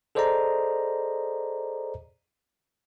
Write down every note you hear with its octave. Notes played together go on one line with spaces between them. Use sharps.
G#4 A4 C5 D5 D#5 A#5